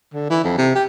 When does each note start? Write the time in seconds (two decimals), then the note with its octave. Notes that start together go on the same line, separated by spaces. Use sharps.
0.14 D3
0.30 E3
0.44 F2
0.58 C3
0.75 G4